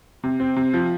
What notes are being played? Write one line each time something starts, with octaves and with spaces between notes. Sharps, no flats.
C3
C4
C3
F3